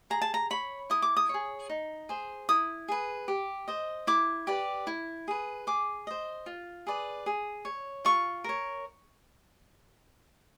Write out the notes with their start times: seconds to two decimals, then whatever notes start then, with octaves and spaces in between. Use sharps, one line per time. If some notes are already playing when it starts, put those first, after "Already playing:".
0.10 G#4 A#5
0.22 A5
0.34 A#5
0.50 C#5 B5
0.90 E4 D#6
1.02 D6
1.17 D#6
1.29 G#4 C#5
1.69 D#4
2.09 G#4 C5
2.49 E4 D#6
2.88 G#4 B4
3.28 G4
3.68 C5 D#5
4.07 E4 D6
4.47 G4 B4 D5
4.87 E4
5.28 G#4 B4
5.67 G#4 D6
6.07 C5 D#5
6.46 F4
6.87 G#4 B4 D5
7.26 G#4
7.65 C#5
8.05 F4 C#6
8.44 A#4 C#5